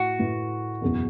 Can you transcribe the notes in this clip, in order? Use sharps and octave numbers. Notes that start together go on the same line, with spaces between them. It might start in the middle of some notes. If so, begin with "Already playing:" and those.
Already playing: A2 A3 E4 F#4
A2 A3 E4 B4
F#1 E2 B2